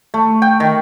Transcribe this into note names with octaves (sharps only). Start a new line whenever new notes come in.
A3
G5
D#3